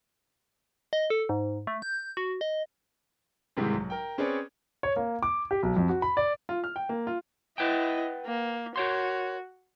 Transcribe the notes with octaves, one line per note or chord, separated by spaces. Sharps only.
D#5
A4
G#2
A3
G6
F#4
D#5
G#2 C3 D#3 E3 G3 G#3
B1
A#4 G5
C4 C#4 G#4 B4 C#5 D5
C#5
A#3
D6
G4
B1
F2
F#4
B5
D5
F4
F6
G5
A#3
F4
E4 B4 D#5 F#5 G5
A#3
F#4 A#4 C#5 C6